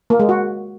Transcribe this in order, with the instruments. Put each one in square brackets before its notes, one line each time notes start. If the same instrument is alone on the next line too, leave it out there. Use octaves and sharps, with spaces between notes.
[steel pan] A#3
G#3
F#4